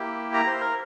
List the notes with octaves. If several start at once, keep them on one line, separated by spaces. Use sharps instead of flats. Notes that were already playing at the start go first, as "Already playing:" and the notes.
Already playing: A#3 E4 G4
A#5
C5
A#4